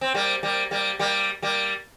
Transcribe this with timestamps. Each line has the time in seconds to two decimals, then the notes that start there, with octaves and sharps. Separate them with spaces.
0.01 C4
0.15 G3 A#3
0.43 G3 A#3
0.71 G3 A#3
0.99 G3 A#3
1.42 G3 A#3